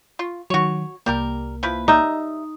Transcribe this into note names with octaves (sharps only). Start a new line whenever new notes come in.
F4
D#3 F#3 F#4 C#5
C2 G3 A#3 G4 A#4
F3 E4 B4
G3 D#4 E5